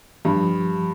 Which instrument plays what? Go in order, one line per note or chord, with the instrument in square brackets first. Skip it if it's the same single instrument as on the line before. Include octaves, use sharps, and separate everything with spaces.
[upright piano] G2 [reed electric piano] E3
[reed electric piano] F3